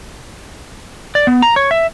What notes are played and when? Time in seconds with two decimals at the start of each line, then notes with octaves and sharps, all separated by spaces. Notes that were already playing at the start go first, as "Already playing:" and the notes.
1.15 D5
1.27 B3
1.42 A#5
1.56 C#5
1.71 E5